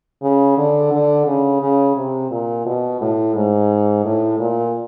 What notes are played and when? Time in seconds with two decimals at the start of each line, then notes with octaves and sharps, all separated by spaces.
0.22 C#3
0.57 D3
0.92 D3
1.26 C#3
1.61 C#3
1.96 C3
2.31 A#2
2.66 B2
3.01 A2
3.35 G#2
4.05 A2
4.39 A#2